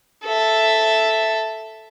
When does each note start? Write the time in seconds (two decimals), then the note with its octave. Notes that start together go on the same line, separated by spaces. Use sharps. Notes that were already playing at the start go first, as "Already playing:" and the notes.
0.25 A4 E5